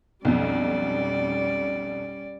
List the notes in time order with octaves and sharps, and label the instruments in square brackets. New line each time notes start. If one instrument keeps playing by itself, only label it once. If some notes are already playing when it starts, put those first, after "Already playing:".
[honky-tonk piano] B1 F2 [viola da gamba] G3 C#4 D5